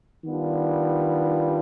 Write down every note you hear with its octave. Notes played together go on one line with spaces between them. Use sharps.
D#3 G3 B3 D4 F4